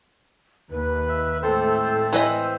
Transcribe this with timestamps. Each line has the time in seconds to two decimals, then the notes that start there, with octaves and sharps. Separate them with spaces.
0.71 D#2 B4
1.09 E5
1.42 A2 G#3 A3 C4 A4 C5 E6
2.13 E3 B4 D#5